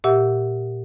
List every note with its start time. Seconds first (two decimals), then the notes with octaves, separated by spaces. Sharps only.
0.04 A#2 G4 E5 F#5 E6